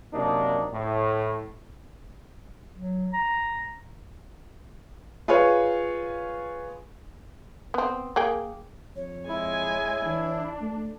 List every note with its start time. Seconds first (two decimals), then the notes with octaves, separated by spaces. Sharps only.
0.13 F#2 C3 A#3 D4 D#4
0.73 A2
2.74 F#3
3.13 A#5
5.28 F4 G#4 B4 C#5
7.74 B3 C4
8.16 A#3 G#4 G5
8.96 F2 C#5
9.29 G#3 E4 G#5
10.06 E3 D4
10.61 A3